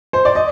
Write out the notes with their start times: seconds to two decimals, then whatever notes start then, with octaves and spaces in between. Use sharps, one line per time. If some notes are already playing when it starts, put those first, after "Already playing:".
0.13 C5
0.25 D5
0.35 D#5